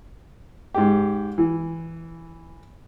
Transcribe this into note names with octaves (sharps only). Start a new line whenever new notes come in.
G#2 G4
E3